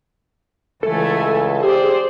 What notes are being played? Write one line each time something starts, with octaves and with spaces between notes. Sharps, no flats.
C#2 E3 A3 A4 G#5
G4 G#4 C5 D5